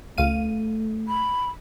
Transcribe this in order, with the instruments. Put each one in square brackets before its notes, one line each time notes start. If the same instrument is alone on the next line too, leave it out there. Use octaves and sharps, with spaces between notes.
[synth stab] C#2 F5 D#7 [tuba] A3
[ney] B5